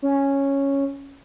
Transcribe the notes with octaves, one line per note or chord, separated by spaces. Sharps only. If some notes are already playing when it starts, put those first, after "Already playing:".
C#4